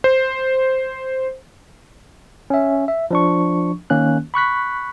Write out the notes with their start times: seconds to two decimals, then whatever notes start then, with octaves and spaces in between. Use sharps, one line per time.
0.04 C5
2.50 C#4 E5
2.88 E5
3.11 F3 D4 C#6
3.90 D#3 A#3 C#4 F#6
4.34 B5 C#6 F#6 B6